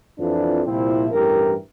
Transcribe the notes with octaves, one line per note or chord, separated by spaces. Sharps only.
F2 E3 D4 F4
C2 A#2 F3 C4 E4
A1 G2 E3 G4 A#4